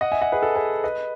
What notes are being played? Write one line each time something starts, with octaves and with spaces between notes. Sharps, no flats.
D#5 F#5
E5 G#5
D#5 F#5
G#4 B4
A4
G#4 B4
B4 D#5